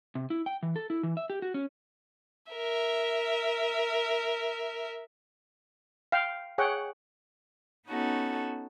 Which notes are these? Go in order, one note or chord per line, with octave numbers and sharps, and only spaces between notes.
C3
E4
G5
E3
A4
E4
E3
E5
G4
F#4
C#4
A#4 E5
F5 G5
G#4 C#5 F#5 G5
B3 C#4 D#4 F#4 A4